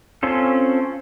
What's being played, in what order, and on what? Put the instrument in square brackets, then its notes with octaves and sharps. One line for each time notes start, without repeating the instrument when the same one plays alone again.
[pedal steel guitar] C4 C#4 F4 A4